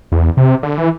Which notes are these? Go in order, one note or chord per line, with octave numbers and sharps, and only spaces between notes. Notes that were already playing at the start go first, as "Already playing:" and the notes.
E2
C3
D3
E3